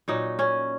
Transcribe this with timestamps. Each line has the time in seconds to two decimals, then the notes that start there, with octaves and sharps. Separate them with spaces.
0.08 A#2 F#3 D#4
0.39 C#4